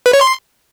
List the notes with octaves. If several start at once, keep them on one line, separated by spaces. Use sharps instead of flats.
B4
C#5
C6